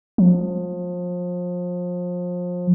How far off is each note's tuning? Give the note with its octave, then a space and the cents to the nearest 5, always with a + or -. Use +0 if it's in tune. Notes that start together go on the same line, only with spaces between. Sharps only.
F3 +30